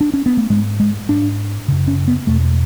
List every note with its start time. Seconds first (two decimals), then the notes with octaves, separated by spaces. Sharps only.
0.01 D4
0.14 C#4
0.26 B3
0.37 A3
0.50 G#2 G#3
0.80 G#3
1.09 G#2 D4
1.68 F#2 C#3
1.88 C#4
2.08 B3
2.27 E2 B2 A3